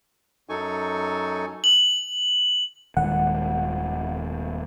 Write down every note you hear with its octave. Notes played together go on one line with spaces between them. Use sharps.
F#2 F#3 D#4 A4 G#5 C#6
F#7
D#1 D#3 G#3 F#5